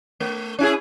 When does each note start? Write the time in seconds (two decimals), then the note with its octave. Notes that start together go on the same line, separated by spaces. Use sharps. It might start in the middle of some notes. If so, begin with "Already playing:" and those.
0.20 A3
0.59 C#4 E4 G#4